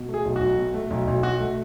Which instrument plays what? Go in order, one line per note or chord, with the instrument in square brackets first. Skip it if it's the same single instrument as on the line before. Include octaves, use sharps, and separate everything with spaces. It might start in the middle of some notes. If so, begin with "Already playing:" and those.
Already playing: [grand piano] B2
A3
G#4
B1
F#4
B1
B2
A3
B1
B1
B2 F#4
A3